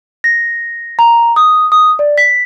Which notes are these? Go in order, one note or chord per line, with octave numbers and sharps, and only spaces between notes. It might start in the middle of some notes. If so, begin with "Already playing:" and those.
A#6
A#5
D#6
D#6
D5
B6